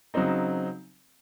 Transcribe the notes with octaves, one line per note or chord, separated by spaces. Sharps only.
C#3 F#3 C4 D#4